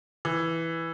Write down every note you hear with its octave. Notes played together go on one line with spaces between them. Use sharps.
E3